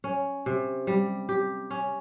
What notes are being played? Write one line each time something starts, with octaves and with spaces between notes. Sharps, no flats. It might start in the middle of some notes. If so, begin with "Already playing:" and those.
C#4
C3
G3
G4
C#4